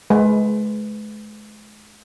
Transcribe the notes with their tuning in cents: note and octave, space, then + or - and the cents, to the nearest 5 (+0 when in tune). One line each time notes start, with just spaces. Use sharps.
G#3 +35 B4 +25